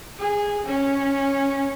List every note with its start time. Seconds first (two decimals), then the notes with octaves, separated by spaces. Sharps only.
0.19 G#4
0.66 C#4